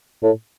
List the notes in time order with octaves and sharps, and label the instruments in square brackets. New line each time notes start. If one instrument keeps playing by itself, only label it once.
[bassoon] A2